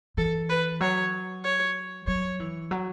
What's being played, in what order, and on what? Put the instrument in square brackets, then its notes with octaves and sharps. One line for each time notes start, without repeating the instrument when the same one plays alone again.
[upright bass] E3 [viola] A4
[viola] B4
[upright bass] F#3 [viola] C#5
[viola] C#5
[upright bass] F#3 [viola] C#5
[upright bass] E3
F#3